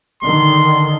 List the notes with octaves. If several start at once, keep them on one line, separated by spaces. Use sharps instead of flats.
D3 D#3 C6